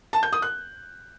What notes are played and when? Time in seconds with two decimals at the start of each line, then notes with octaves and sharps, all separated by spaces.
0.13 A5
0.23 G6
0.33 D#6
0.42 F#6